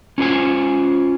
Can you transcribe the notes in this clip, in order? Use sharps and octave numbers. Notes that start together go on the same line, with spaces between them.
C#4 F4 C5 G#5